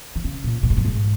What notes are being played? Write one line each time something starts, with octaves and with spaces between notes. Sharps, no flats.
D#3
C#3
A#2
A#2
G#2
F#2
G#2